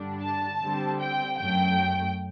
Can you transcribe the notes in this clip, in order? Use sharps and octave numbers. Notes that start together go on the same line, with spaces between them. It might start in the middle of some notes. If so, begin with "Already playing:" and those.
Already playing: G2 D3 G3 D4
A5
D3 G3 C4
G5
F#2 F#3 A3 G5